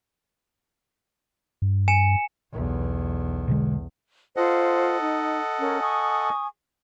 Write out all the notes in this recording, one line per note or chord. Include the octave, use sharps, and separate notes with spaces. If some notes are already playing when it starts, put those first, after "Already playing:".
G2
G#5 C#7 E7
B1 E2
B2 D3 G#3
F4 A4 C5 D#5 F#5
D#4
C#4 A#4
G#5 C#6 D#6